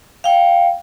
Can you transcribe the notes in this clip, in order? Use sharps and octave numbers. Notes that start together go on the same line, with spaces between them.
F5 G5